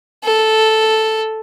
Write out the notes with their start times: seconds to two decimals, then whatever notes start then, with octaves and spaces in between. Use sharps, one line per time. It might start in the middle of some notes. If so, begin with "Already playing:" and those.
0.24 A4